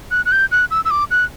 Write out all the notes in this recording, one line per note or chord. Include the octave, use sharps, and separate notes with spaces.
F#6
F#6
G6
F#6
E6
E6
D6
F#6